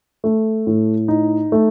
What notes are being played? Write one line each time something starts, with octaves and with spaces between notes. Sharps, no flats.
A3
A2
D#4
A3